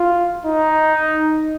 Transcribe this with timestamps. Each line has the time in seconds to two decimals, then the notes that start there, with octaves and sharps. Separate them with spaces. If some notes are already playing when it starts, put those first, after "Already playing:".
Already playing: F4
0.45 D#4